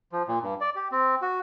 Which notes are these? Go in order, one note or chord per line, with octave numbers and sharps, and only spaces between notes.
F3
A#2
G2
D5
G4
C4
F#4